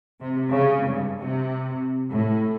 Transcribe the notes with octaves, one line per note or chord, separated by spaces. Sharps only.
C3
C#3
G2
C3
A2